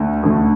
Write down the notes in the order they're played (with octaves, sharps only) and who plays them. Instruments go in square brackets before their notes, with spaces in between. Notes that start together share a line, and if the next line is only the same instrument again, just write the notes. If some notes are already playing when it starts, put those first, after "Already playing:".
Already playing: [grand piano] D2 D3 A3
D2 D3 A3